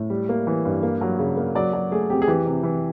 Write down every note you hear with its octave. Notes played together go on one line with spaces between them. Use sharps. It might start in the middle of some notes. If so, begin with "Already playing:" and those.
Already playing: A2
G3
A#3
E3
G2
A#3
F#3
C#3
A#3
F#3 D5
F#3 D5
A3 G#4
F2 G4
G#4
E3 G4
C3
E3